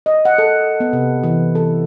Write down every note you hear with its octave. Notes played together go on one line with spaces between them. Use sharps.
D#5
F#5
A4
B3
C3
E3
A4